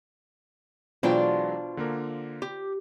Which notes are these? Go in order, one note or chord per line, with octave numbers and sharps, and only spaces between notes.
B2 E3 F#3 G#3 D4 F4 C5 G5
D3 A#3 A#4
G4